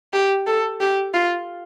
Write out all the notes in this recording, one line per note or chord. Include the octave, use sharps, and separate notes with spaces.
G4
A4
G4
F4